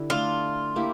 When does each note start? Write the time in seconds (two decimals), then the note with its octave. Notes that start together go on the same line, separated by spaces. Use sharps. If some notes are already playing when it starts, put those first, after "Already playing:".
Already playing: D3 E4 G4
0.10 A3 D4 F4 A4
0.76 A#3 E4 G4